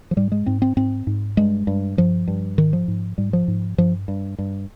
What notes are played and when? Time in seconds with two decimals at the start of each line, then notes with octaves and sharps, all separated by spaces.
0.11 F3
0.16 G#2 G3
0.32 G#3
0.46 G#2 C4
0.62 C4
0.77 G#2 C4
1.07 G#2
1.37 G2 G#3
1.67 G2
1.97 G2 F3
2.28 G2
2.58 G#2 D#3
2.73 F3
2.88 G#2
3.18 G#2 G3
3.33 F3
3.48 G#2
3.78 G2 F3
4.08 G2
4.38 G2